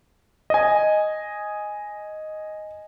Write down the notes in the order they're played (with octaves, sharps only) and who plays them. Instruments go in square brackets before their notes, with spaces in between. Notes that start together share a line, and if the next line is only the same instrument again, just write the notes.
[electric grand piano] D#5 G#5